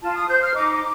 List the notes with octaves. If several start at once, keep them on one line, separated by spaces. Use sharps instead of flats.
F4 A5
D#6
C5 G6
F6
D#4 D6